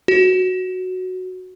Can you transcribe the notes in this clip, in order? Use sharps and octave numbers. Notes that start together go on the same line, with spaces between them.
F#4